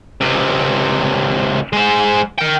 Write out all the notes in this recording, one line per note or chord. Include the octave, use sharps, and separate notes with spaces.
C#2 C3
G#3 C5
A#4 G5